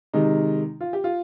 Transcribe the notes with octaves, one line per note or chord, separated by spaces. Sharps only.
C3 D#3 G#3 D#4
F4
G4
F4